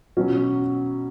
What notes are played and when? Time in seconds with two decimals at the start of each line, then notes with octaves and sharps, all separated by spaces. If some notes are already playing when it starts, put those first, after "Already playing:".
0.17 E2 B2 F#3 C#4